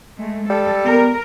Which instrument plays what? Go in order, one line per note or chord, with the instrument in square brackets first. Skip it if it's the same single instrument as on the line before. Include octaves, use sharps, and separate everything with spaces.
[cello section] G#3 A3
[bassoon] G3 [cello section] A4
[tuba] B3 [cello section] A#4